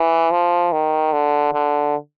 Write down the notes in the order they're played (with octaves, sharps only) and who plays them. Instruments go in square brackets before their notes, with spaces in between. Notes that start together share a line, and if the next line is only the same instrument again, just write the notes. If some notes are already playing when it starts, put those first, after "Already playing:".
Already playing: [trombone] E3
F3
D#3
D3
D3